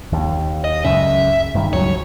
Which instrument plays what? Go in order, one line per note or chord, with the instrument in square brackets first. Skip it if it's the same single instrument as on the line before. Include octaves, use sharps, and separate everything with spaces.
[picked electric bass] D#2
[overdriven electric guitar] D#5
[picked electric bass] C#2 F#2 C#3 [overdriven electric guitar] E5
[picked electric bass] G2 D#3
[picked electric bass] C#2 E3 F#3 [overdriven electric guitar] C#5